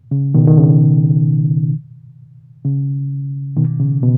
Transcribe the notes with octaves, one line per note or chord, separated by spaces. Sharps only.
C#3
B2 D#3
D#3
C#3
C#3
B2 D#3
C#3
B2